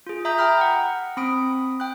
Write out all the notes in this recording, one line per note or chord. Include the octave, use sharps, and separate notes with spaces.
F4 G#4
E5 A#5 D#6 G6
G5 A#5 B5 F6 G6
F#5
C4 B5 D#6 D7
G5 F#6